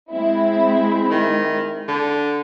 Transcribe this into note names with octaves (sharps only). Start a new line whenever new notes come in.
G#3 C4 E4
D#3
D3